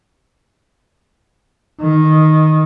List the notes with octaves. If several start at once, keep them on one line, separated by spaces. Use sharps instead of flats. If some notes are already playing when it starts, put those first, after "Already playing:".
D#3